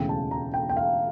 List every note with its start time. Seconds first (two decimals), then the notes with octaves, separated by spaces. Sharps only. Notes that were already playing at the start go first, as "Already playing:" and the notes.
Already playing: E1 D2 C#3 E3 G5
0.09 A5
0.31 A#5
0.54 G5
0.69 G5
0.77 F5